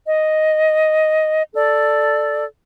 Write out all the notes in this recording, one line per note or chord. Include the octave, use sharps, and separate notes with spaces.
D#5
A4 D5